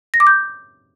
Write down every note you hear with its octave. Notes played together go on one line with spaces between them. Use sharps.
A#6
D6
G6